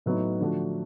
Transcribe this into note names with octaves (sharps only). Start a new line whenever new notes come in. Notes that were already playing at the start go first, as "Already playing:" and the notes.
A2 F#3 B3 D#4
D3 F3 A3 D4 F#4